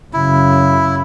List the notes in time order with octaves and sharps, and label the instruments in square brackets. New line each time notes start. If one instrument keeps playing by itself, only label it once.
[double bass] F#2 C#3 [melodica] E4